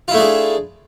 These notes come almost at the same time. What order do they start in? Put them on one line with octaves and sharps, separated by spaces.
F4 E4 A3 D4 G#4